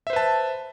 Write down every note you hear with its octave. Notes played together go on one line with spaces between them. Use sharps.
B4 C5 E5 A5